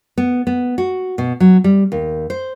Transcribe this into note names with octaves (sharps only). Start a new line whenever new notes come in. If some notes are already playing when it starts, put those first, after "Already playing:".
B3
B3
F#4
B2
F#3
G3
D#2
C5